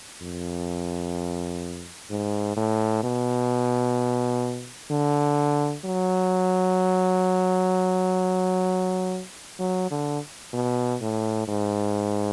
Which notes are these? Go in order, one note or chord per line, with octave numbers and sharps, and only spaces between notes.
F2
G#2
A2
B2
D3
F#3
F#3
D3
B2
A2
G#2